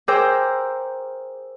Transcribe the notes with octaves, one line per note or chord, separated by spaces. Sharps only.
G#4 A#4 C5 G5 D6 E6